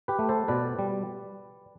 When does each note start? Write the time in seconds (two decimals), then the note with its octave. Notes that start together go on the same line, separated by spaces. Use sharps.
0.08 G4 B4
0.19 A3
0.29 A4 C5
0.48 B2 B4 D5
0.79 G3